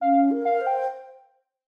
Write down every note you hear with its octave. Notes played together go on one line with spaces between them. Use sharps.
C#4 F5
A#4
F5
C5
G5